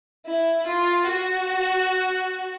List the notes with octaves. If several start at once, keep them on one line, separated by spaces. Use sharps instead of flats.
E4
F4
F#4